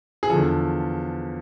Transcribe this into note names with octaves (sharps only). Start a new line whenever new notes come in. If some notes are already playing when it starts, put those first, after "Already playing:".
G#4
E2 D3 F3 A4